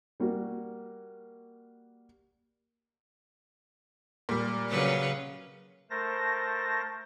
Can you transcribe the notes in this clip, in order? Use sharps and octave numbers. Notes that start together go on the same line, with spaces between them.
G3 A#3 F#4
A#2 G3
C#3 F#3 B4
A3 A#4 C5 A5 A#6